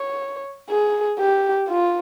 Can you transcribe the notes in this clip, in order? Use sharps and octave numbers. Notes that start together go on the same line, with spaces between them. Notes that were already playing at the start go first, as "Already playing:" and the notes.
Already playing: C#5
G#4
G4
F4